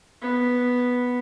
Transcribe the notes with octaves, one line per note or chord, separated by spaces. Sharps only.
B3